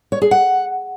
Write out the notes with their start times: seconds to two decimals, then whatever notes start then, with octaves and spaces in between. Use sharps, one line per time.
0.12 C#5
0.22 G#4
0.31 F#5